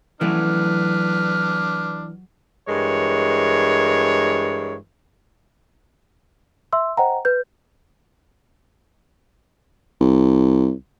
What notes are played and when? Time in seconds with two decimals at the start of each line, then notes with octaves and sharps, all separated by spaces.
0.21 E3 F#3 A3 D4 B4 F6
2.68 G2 E3 G#3 A#4 C#5
6.73 E5 C6 E6
6.97 C5 D#5 F#5 G5 A#5
7.25 B4 G6
10.01 C2